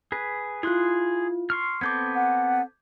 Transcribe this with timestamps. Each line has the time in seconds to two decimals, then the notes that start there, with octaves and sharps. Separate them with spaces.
0.12 G#4 B4
0.63 E4 F4 G#4 C6 F#6
1.50 C6 C#6 F6
1.81 B3 C4 A4 D6 G6 G#6
2.15 F#5